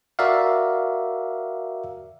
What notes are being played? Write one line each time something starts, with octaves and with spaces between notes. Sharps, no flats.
F#4 A#4 D5 E5 F5